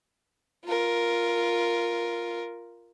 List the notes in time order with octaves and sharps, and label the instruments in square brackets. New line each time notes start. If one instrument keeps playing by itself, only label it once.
[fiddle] F4 A#4